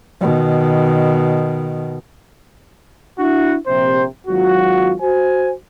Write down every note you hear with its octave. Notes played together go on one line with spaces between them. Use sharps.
B2 D#3
D4 E4 F#4
A#1 C3 C5
G#1 F#3 F4 F#4
F#4 C5 G#5